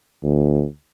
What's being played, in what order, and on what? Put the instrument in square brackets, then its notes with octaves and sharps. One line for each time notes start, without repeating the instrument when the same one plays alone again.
[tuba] D2